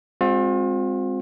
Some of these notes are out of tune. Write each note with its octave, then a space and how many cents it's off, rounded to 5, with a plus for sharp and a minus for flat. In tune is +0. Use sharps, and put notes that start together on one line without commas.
G#3 -30 C4 +0 F4 +40